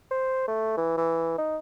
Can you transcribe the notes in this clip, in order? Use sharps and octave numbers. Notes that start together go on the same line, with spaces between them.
C5
A3
E3
E3
D#4